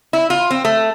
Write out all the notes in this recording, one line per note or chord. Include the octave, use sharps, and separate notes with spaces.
E4
F4
C4
A3